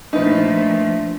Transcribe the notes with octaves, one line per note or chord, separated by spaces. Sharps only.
A#2 F3 A3 D4 D#4 B4